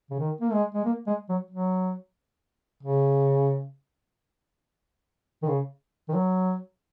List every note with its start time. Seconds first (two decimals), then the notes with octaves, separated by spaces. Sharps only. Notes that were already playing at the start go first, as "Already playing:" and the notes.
0.10 C#3
0.19 D#3
0.41 A#3
0.52 G#3
0.74 G#3
0.85 A#3
1.07 G#3
1.29 F#3
1.51 F#3
2.83 C#3
5.42 D#3
5.48 C#3
6.09 D#3
6.14 F#3